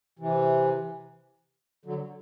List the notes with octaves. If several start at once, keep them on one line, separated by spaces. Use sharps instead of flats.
C3 E3
D3 F#3